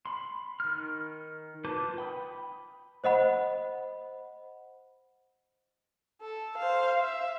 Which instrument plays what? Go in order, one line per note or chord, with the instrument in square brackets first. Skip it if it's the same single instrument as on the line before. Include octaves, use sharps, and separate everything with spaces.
[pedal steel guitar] B5 C6
D#3 F6
F4 B4 A5 D6 G6
G5 B5 D#6
[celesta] C5 D#5 F#5 B5
[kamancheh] A4
C5 F5
E5